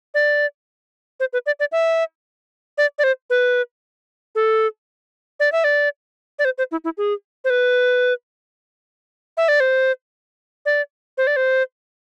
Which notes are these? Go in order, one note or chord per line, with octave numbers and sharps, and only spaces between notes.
D5
C5
B4
D5
D5
E5
D5
D5
C5
B4
A4
D5
E5
D5
D5
C5
C5
E4
E4
G#4
C5
B4
E5
D5
C5
D5
C5
D5
C5